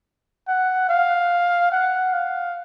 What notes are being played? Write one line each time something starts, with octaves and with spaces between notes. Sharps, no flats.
F#5
F5
F#5
F5